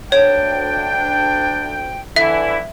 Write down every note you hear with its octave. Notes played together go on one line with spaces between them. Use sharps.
D2 D4 C#5 G5
D3 E3 E4 E5